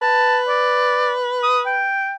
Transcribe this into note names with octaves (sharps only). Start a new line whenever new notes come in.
B4 A5
D5
D#6
G5